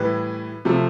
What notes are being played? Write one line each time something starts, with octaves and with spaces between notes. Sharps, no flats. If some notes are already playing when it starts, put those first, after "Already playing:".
Already playing: A2 E3 G3 B4
C3 F3 A3